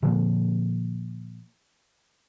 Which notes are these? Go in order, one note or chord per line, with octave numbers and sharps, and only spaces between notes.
A#2 D3 F3 A#3